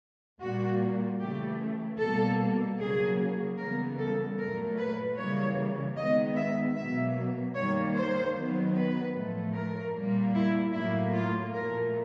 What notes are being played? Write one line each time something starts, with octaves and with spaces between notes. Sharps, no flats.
A#2 G3 A#3 F#4
C#3 E3 A3 G4
B2 G3 A#3 A4
C#3 F#3 A#3 G#4
C#3 E3 G3 B3 A#4
A4
A#2 F#3 A3 A#4
B4
C#3 E3 G3 A#3 C#5
D#3 G#3 B3 D#5
E5
B2 F#3 A#3 E5
D#3 G3 A#3 C#5
C5
D#3 F#3 B3
B4
A2 F3 A3
A#4
A#2 G3 A#3
E4
A2 F#3 A#3 E4
F4
A#2 F3 A3 A#4